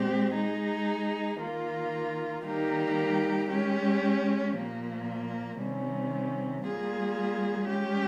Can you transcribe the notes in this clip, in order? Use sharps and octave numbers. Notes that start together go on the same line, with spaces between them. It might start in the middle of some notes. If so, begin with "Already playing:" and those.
Already playing: A#2 G#3 C4 G4
G#3 D#4 G#4
D#3 A#3 F4
D#3 G3 A#3 D#4 G4
G#3 C#4 G4
A#2 F3 A#3
C3 D#3 G3 C#4
G3 A#3 F4 G#4
G#3 C#4 G4